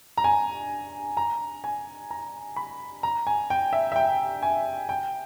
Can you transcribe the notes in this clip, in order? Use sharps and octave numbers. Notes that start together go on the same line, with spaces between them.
A#5
G#5
A#5
G#5
A#5
B5
A#5
G#5
G5
E5
E5
G5
G#5
G5